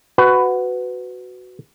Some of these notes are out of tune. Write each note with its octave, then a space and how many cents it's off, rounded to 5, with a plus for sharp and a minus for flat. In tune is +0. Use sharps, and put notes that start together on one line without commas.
F#4 +0 B4 +20